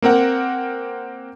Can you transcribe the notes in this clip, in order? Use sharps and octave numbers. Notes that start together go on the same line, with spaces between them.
A#3 C4 A#4 F#5